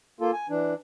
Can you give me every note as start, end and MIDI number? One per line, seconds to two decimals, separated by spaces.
0.20 0.31 58
0.20 0.31 65
0.20 0.31 69
0.33 0.47 80
0.49 0.74 52
0.49 0.74 62